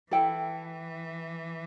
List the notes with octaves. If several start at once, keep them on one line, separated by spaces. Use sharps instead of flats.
E3 E4 A4 G5